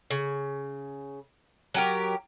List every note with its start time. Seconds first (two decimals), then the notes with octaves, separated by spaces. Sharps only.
0.11 C#3
1.74 F#3 G4 A#4